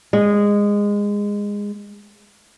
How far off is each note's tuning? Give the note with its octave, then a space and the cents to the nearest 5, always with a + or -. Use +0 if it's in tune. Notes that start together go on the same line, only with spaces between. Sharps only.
G#3 -20